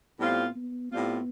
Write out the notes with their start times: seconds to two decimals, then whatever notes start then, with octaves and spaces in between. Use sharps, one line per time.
0.20 A2 G3 B3 C4 F4
0.56 B3
0.92 A2 G3 B3 C4 F4